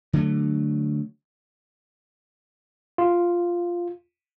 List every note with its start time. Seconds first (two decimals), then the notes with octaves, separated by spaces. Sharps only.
0.13 D3 F#3 A3
2.98 F4